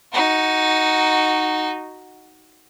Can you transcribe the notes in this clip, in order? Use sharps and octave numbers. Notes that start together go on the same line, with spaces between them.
D#4 F#4